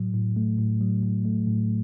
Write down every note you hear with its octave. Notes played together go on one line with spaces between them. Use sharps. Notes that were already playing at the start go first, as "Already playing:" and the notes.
Already playing: A2 F#3
A2
A3
A2
F#3
A2
A3
A2